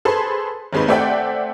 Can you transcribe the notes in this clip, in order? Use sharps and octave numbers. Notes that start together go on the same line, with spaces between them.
G#4 A4 B4 C5
G#1 D#2 G#3 D#4 B4
A3 C4 D5 E5 F#5 G5